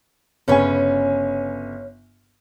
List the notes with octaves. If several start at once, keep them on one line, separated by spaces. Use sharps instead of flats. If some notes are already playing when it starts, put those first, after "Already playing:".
G1 C#3 C#4 B4 C#5 G#5